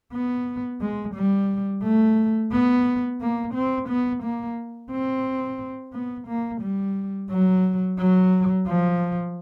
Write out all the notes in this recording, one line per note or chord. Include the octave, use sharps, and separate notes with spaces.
B3
G#3
G3
A3
B3
A#3
C4
B3
A#3
C4
B3
A#3
G3
F#3
F#3
F3